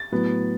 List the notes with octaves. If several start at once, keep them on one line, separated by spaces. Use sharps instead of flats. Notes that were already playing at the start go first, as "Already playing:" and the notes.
Already playing: A6
A2 F#3 B3